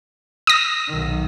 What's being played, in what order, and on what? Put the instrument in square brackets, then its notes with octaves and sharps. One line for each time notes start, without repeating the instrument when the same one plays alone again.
[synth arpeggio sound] D#6 A#6
[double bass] B1 D#3